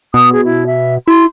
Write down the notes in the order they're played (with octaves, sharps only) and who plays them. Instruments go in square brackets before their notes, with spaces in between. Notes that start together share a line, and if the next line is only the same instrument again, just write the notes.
[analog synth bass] B2 [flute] D#6
[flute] G#4
E4
E5
[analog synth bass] E4 [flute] C6